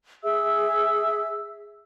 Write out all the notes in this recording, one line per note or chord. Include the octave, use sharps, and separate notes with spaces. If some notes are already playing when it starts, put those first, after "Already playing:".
G#4 E5 E6